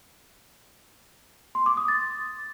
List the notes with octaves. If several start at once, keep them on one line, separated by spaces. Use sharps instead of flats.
C6
D6
D#6
A6